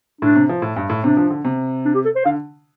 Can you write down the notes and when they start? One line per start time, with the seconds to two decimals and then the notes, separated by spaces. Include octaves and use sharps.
0.21 A2 D4
0.36 C3
0.49 F3
0.62 A2
0.76 G2
0.90 A2
1.03 C3 D4
1.17 F3
1.31 D3
1.45 C3
1.85 D4
1.95 G4
2.05 A4
2.16 C5
2.25 D3 F5